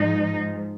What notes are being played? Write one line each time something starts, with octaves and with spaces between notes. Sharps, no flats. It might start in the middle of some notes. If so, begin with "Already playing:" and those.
Already playing: G#2 F3 D#4